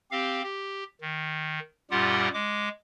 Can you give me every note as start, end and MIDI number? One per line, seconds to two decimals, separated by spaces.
0.11 0.43 60
0.11 0.43 67
0.11 0.43 77
0.43 0.84 67
1.01 1.59 51
1.91 2.29 42
1.91 2.29 46
1.91 2.29 55
1.91 2.29 65
1.91 2.29 67
1.91 2.29 78
2.34 2.69 56
2.34 2.69 86